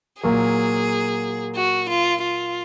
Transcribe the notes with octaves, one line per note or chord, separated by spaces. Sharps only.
A#2 F#3 A#3 G#4
F#4
F4
F4